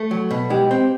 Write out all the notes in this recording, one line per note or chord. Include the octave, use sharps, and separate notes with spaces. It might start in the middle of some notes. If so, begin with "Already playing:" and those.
Already playing: A3
F#3
B2
G#3 G4
C4